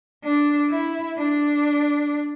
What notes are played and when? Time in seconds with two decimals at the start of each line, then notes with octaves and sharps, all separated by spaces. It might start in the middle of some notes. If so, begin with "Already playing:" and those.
0.24 D4
0.70 E4
1.18 D4